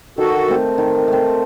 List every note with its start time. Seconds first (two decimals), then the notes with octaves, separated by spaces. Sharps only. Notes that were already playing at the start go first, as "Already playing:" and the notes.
0.18 D#3 F#4 A4
0.48 A3 C4
0.78 D#3
1.08 A3 C4